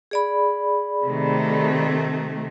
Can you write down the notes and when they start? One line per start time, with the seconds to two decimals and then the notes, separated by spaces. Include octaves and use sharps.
0.11 G#4 D5 B5
1.05 C3 D#3 A3